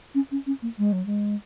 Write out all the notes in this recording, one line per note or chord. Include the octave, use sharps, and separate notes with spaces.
C#4
C#4
C#4
A#3
G#3
F#3
G#3